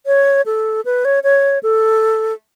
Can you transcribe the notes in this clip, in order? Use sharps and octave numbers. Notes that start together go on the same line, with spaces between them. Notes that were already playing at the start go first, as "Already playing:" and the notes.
C#5
A4
B4
C#5
C#5
A4